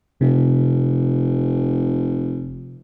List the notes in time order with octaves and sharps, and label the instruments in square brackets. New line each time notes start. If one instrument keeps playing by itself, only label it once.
[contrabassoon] F1 [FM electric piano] C3